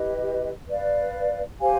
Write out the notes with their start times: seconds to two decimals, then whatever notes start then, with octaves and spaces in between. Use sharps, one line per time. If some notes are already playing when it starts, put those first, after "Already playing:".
Already playing: E4 G4 B4 D#5
0.68 B4 D5 F5
1.60 G4 C5 F5 G#5